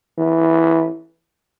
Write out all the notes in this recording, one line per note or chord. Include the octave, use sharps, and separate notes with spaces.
E3